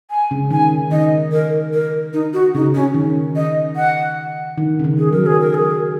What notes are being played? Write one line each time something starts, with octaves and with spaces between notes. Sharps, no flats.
G#5
C#3
D#3 G#5
D#3 D#5
A#4
A#4
D#4
F#4
C#3 D#4
C#4
D#3
D#5
F#5
D#3
C#3
D#3
G#4
F#3 A#4
G#4
A#4
G#4